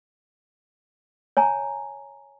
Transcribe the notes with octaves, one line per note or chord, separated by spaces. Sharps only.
C#5 G#5 A#5